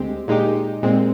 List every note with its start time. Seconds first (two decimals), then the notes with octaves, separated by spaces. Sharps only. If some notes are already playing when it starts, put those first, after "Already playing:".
Already playing: D2 D3 G#3 C4 G4
0.28 A#2 G#3 D#4 G4
0.82 A#2 G#3 C4